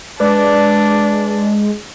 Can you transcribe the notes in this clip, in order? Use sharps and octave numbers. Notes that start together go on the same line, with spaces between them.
G#3 D4 B4 D5 D6